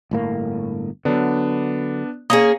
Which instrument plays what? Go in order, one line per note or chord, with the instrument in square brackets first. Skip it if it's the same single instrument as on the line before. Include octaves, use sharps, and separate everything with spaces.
[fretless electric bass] G1 A2 A#3
[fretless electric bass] D3 F#3 [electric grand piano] B3 D4
[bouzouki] A#3 C#4 G#4 [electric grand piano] D#6